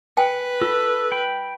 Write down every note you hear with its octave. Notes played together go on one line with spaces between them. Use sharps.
B4 G5 G#5
F4 A4
G5 B5